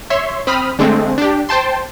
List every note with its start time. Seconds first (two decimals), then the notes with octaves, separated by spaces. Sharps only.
0.10 C#5 E5 C6
0.47 C4 B5 D#6 F6
0.79 D3 G#3 A3 C4
1.18 D4 G4
1.49 C5 G5 A5 C6